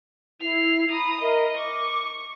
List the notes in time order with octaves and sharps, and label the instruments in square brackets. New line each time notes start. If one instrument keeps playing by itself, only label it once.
[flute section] E4 [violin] C7 F7
[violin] A#5 D#6 [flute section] B5
[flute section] A#4 E5 [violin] D#5
[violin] C#6 [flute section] D6